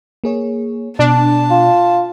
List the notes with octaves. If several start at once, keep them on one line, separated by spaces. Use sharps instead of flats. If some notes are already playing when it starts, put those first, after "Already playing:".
A#3 G#4 C#5
B2 D4 A5
F4